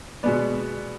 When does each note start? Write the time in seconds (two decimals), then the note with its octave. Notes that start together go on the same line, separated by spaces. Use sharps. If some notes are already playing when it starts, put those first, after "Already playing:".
0.23 B2 G#3 B3 D5